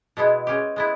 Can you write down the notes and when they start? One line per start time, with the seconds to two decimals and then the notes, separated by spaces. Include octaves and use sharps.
0.17 B2 G#3 B3 E4
0.47 G#3 C#4 G4
0.76 G#3 B3 E4